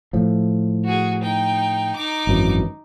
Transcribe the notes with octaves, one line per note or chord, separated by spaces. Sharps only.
A2 F3
F#4 G#4
D#4 G5
D#4 D6
G#1 F#2 E3